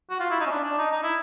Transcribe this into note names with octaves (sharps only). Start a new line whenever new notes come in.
F#4
F4
E4
D#4
C#4
D4
D4
D#4
D#4
E4